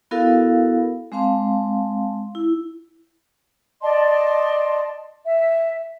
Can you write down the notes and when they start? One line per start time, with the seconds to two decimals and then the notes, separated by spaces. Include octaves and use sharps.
0.11 B3 E4 F#4 A4 A#4 F5
1.12 G#3 C4 F5 A5 C6
2.35 E4
3.82 D5 D#5 A5 C6
5.24 E5